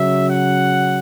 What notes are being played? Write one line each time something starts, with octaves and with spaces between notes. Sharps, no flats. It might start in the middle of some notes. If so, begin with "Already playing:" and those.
Already playing: C#3 F#3 E5
F#5